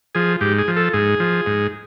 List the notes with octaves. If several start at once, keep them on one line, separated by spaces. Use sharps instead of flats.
F3 G#4
G#2 G4
G#4
F3
A4
G#2 G#4
F3
G#2